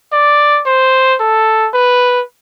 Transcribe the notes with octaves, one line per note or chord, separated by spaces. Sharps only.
D5
C5
A4
B4